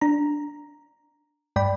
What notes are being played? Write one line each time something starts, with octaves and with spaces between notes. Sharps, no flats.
D4 A#5
G2 D5 G5 B5